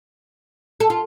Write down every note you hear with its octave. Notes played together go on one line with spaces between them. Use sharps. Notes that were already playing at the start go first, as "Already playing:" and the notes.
A4
F4